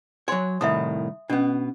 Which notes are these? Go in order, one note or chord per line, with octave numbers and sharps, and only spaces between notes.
F#3 C#5 G#5 C6
C2 A2 D#3 E5 D#6
B2 B3 C#4 D4